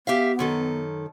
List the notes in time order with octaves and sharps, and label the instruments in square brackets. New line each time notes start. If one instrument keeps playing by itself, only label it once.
[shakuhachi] B3 [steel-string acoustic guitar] G4 E5 F5
[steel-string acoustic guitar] F#2 D#3 A4